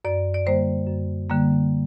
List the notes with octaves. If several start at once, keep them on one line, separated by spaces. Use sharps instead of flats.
F#2 D5
D5
D3 G3 A#3 C5
F#2
D3 G3 A#3